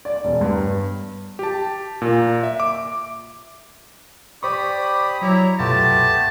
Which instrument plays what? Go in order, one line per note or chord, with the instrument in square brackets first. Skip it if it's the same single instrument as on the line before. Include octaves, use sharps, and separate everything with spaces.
[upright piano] D5
E1
G2
[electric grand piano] G4 A5
A#2
E5
D6
[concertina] G4 B5 D#6 [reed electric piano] C5 C#6 [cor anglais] D5
[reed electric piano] F#3 [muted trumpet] E4 [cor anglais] C#5 [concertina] A#5
[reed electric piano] C2 F#2 B2 [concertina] A3 B3 G4 [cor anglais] F4 [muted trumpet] A5